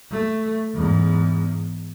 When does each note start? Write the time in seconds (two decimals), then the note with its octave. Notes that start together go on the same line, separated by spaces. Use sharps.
0.11 A3
0.75 E2 G#2